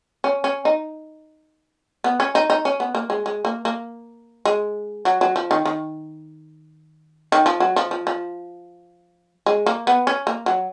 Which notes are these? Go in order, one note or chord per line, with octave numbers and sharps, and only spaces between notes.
C#4
C#4
D#4
B3
C#4
D#4
D#4
C#4
B3
A#3
G#3
G#3
A#3
A#3
G#3
F#3
F#3
F3
D#3
D#3
D#3
F3
F#3
F3
F3
F3
G#3
A#3
B3
C#4
A#3
F#3